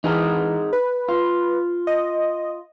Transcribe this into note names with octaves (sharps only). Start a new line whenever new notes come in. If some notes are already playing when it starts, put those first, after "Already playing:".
E3 D#4 G#4 A#4
B4
F4
D#5